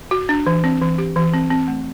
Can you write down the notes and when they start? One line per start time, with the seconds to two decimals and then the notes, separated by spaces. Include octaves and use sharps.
0.11 F#4
0.29 D4
0.46 E3
0.64 C4
0.81 E3
0.98 G4
1.16 E3
1.34 C4
1.51 C4
1.68 A3